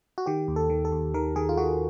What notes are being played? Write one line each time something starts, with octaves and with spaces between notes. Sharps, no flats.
F#4
D#3 G4
D#2
A4
D#3
A4
D#2
D#3 A#4
D#3 G#4
F4
D#3 F#4